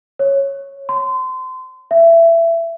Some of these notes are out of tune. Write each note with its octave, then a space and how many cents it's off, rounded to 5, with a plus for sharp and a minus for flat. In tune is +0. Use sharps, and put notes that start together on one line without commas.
C#5 -10
C6 -30
E5 +20